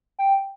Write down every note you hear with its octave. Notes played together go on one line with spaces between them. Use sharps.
G5